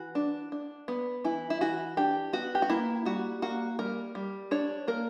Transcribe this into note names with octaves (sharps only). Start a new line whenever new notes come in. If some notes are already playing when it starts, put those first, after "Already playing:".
Already playing: E3 F#4
D4
D4
B3
E3 E4
E4
E3 F#4
D4 G4
B3 F#4
G4
F#4
A#3 E4
G3 F#4
A#3 F#4
G3 A#4
G3
D4 C#5
A#3 A#4